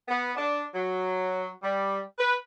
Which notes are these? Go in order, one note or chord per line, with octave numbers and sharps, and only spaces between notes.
B3
D4
F#3
G3
B4